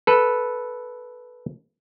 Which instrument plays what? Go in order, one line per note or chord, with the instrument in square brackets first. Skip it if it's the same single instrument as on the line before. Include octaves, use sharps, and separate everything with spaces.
[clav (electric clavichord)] A4 B4